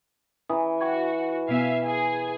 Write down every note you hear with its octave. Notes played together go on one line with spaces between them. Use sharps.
E3 A#5 D#6
F#4 G5 C#6 G#6
B2 B3 E5 F5 G#5
G#4 E5 G#5